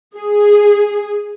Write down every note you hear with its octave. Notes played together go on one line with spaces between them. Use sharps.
G#4